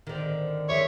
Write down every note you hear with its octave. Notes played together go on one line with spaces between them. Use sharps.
G#1 D3 D#3 C5
E2 F3 G3 C#5 E5